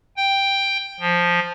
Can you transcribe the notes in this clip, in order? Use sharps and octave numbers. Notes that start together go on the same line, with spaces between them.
G5
F3